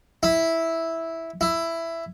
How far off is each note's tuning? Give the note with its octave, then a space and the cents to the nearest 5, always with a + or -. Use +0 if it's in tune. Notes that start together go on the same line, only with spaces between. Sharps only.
E4 -5
E4 +10